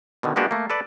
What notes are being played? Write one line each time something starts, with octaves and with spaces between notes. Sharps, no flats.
B2 D3 D#3
G#3 A#3 B3 D4 F#4 G4
A3 A#3
A4 B4 D5